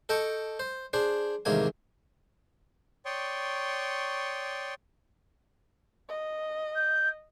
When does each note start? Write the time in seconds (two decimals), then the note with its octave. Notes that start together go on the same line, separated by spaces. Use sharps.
0.09 A4 D#5 G5 A5 C#6
0.59 C5
0.93 D4 G#4 C5
1.45 A1 D#2 C3 G#3 A#3 G#5
3.05 C#5 D5 G5 C6 C#6 D#6
6.09 D#5
6.76 G6